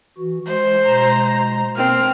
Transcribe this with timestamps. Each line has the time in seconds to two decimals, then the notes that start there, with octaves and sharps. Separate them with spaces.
0.18 E3 F#4
0.48 G#3 C5
0.85 B2 G#3 A#5
1.77 A#3 C4 A#4 F6